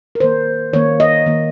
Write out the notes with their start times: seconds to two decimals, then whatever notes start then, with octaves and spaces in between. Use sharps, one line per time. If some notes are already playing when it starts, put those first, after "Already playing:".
0.15 A#4
0.20 D#3 A#3 C5
0.73 D#3 A#3 C#5
1.00 D#5
1.26 D#3 A#3